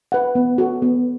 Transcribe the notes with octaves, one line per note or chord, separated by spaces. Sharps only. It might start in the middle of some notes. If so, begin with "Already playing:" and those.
B4 F#5
B3
F#4 A4
B3